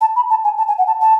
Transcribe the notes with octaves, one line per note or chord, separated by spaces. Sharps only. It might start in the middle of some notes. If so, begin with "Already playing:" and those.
A5
B5
A5
G#5
A5
G#5
F#5
A5
A5